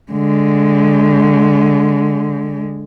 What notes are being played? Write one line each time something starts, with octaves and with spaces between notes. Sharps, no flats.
D3 G#3